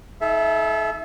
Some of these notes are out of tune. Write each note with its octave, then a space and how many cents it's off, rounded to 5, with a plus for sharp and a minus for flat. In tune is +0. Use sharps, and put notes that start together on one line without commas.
D#4 +35 A4 -40 E5 +10